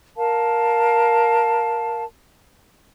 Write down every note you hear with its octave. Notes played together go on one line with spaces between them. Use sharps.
A#4 F5 A5